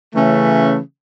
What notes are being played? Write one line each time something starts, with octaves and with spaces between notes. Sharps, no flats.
C#3 E3 A3 C#4